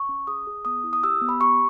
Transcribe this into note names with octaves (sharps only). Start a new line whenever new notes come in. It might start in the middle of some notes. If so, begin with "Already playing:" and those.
Already playing: C#6
C#4
G#4 D#6
G#4
B3 D#6
E4
D#6
G4 E6
B3
B5
G4 C#6